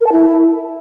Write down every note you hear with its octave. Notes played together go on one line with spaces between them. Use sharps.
A#4
A5
E4